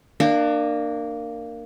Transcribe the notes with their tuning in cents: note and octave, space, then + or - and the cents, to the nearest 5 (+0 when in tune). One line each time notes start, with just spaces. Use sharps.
A#3 -10 D4 +30